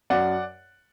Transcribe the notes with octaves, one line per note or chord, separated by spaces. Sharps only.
F#2 D5 F#5